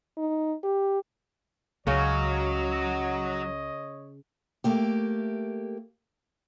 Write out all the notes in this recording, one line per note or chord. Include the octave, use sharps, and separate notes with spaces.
D#4
G4
C#2 C#3 F#3 C#4 C#5 D#5
A3 A#3 G4